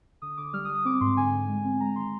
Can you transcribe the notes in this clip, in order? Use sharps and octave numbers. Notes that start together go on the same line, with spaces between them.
D3 D#6
D3 D6
G3 F6
D#6
G3
D#6
C4 D6
G#2 C6
D3 G#5
D3
G#3
C4
G#3 A#5
D#3 C6